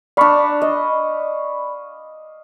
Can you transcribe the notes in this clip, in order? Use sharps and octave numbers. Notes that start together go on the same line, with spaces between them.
D4 D5 F5 B5 C#6
D#5